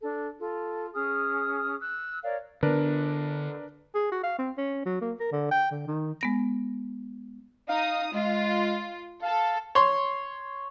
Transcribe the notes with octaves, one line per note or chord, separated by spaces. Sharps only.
D4 A4
F4 A4
C#4 G#4 D#6 F6
E6 F#6
A#4 C#5 D5 F5
D3 B3 D4 A#4 B4
G#4
F#4
F5
C4
C#4
F#3
A#3
A#4
D3
G5
D3
D#3
G#3 B3 A#6
D#4 F5 D#6
G#3 F4
A4 F5
C#5 C6